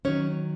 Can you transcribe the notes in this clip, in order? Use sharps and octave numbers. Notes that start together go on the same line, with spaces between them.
D#3 F#3 C#4 C#5